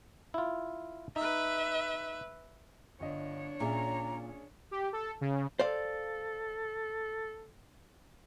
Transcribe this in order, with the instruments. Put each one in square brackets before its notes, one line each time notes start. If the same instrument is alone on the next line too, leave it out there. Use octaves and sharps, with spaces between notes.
[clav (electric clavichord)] E4 F4
[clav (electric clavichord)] D#4 [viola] B4 E5
[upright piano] G1 D#5 [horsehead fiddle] D4 C#5
[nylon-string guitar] A#2 [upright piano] C#4 G#4 E5 [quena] A#5
[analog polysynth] G4
A4
C#3
[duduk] A4 [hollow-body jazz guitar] C5 D5 F5